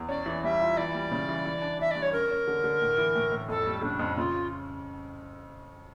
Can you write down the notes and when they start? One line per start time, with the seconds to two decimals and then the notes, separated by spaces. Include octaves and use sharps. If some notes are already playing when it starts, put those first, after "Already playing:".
Already playing: E2
0.09 C#4 D5
0.26 E3
0.44 G3 E5
0.60 F4
0.77 E3 D5
0.94 G3
1.11 C#3
1.28 E3
1.45 E3
1.62 D4
1.79 E3 E5
1.91 G2 D5
2.02 C#5
2.12 C#4 A#4
2.31 C#4
2.47 D3
2.64 D3
2.81 A2
2.98 E3
3.15 A2
3.32 A2
3.48 F2 A4
3.66 G3
3.82 C#3 D4
3.99 F2
4.17 C#3 F4